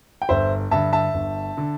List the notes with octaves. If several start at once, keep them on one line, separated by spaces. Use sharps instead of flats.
G5
G1 C5 E5
G2 D3 E5 A5
E5 A5
G1
D3